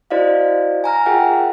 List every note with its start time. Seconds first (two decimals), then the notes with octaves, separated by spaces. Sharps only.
0.11 E4 F#4 C5 D5 D#5 F5
0.84 G#5 A#5 F6 A#6
1.06 F4 G#4 A#4 E5 F#5 G5